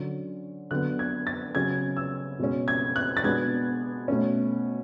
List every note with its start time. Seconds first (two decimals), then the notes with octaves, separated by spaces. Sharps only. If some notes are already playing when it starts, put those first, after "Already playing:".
Already playing: D3 F#3 C#4
0.71 D3 F#3 B3 F#6
0.99 G#6
1.27 A6
1.55 C#3 F#3 C#4 G#6
1.97 E6
2.39 B2 G#3 C#4
2.68 G#6
2.96 F#6
3.17 A6
3.24 B2 G#3 B3 D4 G#6
4.08 B2 A3 C#4